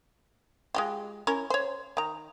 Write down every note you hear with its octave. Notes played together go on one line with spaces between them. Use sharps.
G#3 F4 G4
C#4 E4 A#4
C5 C#5
D#3 A#5